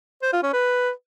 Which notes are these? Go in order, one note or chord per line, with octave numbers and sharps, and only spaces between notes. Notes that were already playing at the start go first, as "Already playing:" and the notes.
C5
F4
C#4
B4